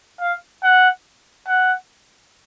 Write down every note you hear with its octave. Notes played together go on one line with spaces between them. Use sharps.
F5
F#5
F#5